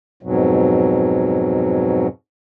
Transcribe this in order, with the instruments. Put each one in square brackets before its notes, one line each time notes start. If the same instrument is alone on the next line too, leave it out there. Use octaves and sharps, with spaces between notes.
[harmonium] F2 G#2 B2 F#3